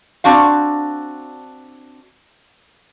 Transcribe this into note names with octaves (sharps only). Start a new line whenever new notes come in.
C4 D4 F#4 F5